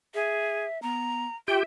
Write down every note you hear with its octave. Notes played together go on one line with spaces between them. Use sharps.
G#4 E5
B3 A#5
F4 G4 E5 G5